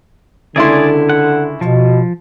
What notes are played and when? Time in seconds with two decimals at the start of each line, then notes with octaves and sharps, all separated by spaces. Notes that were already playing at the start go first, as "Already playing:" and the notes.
0.56 C#2 D3 E4 G#4 D5 C6
1.09 F#5
1.61 B2 F3